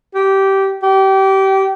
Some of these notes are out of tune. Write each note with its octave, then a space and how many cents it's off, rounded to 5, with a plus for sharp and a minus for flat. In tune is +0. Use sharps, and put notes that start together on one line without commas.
G4 -15
G4 -25